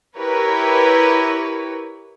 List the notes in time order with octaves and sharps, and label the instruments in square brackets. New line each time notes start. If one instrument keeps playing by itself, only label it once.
[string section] E4 G4 A#4 B4 C#5